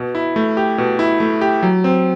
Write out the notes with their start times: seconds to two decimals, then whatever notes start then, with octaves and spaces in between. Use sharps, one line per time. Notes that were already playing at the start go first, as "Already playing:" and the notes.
Already playing: B2
0.15 E4
0.36 A3
0.57 G4
0.78 B2
0.99 E4
1.20 A3
1.41 G4
1.63 F#3
1.84 C4